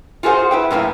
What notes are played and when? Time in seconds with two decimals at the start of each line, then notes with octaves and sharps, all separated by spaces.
0.23 F4 F#4 G#4 A4 C5 F#5
0.51 E4 B4 G5
0.71 F#2 A2 A#3 B4